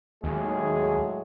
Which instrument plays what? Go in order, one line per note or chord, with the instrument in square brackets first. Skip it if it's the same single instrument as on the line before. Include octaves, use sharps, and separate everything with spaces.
[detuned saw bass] D#2 [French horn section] A2 F#3 G#3 [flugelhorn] G#4